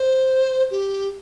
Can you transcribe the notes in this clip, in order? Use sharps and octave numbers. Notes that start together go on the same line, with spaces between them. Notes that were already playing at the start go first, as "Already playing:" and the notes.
Already playing: C5
G4